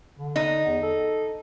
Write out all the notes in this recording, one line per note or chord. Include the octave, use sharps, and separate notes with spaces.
D3
D#4
E2
A4